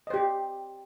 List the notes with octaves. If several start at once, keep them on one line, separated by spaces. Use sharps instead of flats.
G4 C5 D#5